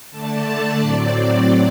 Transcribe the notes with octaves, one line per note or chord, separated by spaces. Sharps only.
D3 A3 D4 A5
D5
A2 F#3 C4